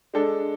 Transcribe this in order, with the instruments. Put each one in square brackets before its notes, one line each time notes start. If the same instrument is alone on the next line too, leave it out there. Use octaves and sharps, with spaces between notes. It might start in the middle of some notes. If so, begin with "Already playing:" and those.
[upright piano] G#3 D4 A4